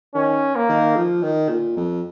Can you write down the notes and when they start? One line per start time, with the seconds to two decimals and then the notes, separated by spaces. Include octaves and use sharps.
0.15 D#3 C#4
0.56 A#3
0.69 D#3
0.96 F3
1.22 D#3
1.49 A#2
1.77 F2